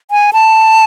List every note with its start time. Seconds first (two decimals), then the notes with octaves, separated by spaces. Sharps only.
0.11 G#5
0.33 A5